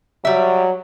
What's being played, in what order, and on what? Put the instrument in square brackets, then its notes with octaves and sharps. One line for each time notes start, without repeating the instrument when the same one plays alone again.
[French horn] F#3 [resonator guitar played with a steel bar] G3 E5